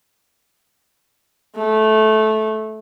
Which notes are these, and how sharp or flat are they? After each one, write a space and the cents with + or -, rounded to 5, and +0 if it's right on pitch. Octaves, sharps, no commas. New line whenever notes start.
A3 -15